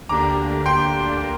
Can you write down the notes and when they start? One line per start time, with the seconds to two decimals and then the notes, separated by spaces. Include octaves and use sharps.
0.09 D2 D3 A#3 D4 G4 A#5 D6
0.66 G5 C6
1.22 A#3